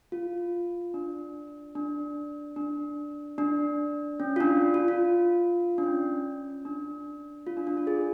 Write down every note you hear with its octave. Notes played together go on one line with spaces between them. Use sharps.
F4
D4
D4
D4
D4
C#4
F4
D4
F4
F4
D4
C#4
D4
F4
D4
D4
F4
G#4